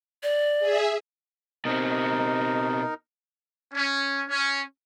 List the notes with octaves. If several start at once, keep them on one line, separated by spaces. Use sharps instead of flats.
D5
G#4 E5
B2 C4 D#4 A#4
C#4
C#4